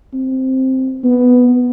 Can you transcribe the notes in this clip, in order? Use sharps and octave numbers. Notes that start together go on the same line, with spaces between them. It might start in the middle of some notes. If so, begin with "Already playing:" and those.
C4
B3